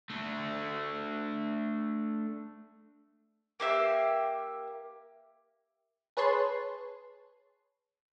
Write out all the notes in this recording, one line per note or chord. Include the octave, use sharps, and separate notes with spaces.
A3 D4
A#3 G4 E5 F5
G#4 B4 C#5 A5 C6